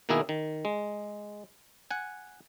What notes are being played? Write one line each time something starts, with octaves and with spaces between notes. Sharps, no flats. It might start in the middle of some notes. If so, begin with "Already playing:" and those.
B2 D#3 A#3 B3 E4 G#4
D#3
G#3
F#5 G#5